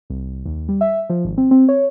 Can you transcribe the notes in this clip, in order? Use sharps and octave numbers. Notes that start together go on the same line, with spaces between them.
C2
D#2
G3
E5
F3
G#1
C4
C4
C#5